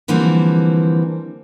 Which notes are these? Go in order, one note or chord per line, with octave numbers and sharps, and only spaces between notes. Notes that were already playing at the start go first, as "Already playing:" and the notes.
D3 E3 F3 G3 A#3 C4